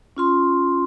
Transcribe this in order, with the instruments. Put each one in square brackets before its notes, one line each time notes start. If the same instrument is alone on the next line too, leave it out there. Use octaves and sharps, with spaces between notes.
[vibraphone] C#4 F4 C6